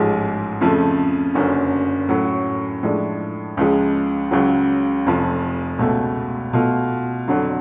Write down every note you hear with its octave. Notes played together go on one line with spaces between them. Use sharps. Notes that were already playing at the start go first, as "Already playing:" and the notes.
Already playing: A1 G#2 F3 G#3
F2 C#3 F3 A3
F#1 F#2 D3
A2 F#3 C#4
A2 F3 G#3 D4
C#2 C#3 F3 G#3
C#2 C#3 F#3
F1 F2 F3
C#2 B2 A3
B2 A3 F4
F2 D3 F#3